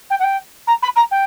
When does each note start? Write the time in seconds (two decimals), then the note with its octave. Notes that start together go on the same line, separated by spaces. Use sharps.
0.10 G5
0.19 F#5
0.24 G5
0.67 A#5
0.82 B5
0.96 A#5
1.11 G5